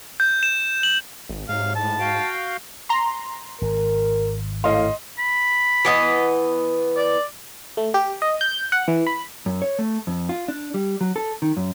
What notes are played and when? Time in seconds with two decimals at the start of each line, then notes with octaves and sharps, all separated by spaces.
0.20 G6
0.43 E7
0.83 F#7
1.29 G#1
1.49 G#2 C3 F#3 F5
1.76 A2 A5
2.00 F#4 F5 G5
2.89 A#5 C6
3.62 G#1 A#4
4.64 A2 D#5 F5 C6
5.19 B5
5.85 E3 B3 D#5
6.97 D5
7.77 A3
7.94 G4
8.22 D#5
8.41 G6
8.72 F#5
8.88 E3
9.07 B5
9.46 F#2
9.62 C#5
9.79 A3
10.07 F2
10.29 F4
10.48 D4
10.74 G3
11.01 F#3
11.16 A4
11.42 D#3
11.57 F#2